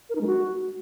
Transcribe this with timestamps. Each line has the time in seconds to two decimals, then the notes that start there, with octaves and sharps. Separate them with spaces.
0.10 A#4
0.15 D#4
0.21 G#3
0.27 F#4